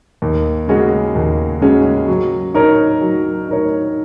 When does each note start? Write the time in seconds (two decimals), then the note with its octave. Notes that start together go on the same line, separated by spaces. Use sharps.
0.22 D#2
0.68 C#3 G#3 C#4 F#4
1.15 D#2
1.61 C#3 G#3 C#4 F#4
2.08 F#3
2.54 D#4 A#4 C#5
3.01 F#3
3.48 D#4 A#4 C#5